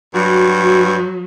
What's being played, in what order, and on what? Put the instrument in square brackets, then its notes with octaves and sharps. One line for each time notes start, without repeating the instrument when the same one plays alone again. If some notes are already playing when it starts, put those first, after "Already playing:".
[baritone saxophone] G2 [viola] F#3 [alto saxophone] F#4